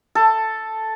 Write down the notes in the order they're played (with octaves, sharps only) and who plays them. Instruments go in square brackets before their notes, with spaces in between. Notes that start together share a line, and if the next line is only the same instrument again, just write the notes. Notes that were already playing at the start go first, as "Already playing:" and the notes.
[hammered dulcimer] A4